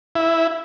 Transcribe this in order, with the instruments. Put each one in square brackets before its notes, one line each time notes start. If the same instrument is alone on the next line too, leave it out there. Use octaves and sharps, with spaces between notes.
[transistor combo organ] E4